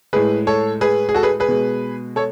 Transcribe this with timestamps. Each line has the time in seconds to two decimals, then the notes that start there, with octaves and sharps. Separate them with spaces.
0.13 A2 G#3 G#4 B4
0.47 A4 C#5
0.81 G#4 B4
1.09 G#4
1.14 F#4 A4
1.23 G#4 B4
1.40 G#4 B4
1.48 B2 G#3
2.16 A4 C#5